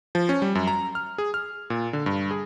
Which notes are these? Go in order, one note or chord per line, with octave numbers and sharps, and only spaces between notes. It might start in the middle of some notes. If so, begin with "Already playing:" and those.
F3
C#4
G3
F#2
A#5
F6
G#4
F6
A#2
D3
G2
G#4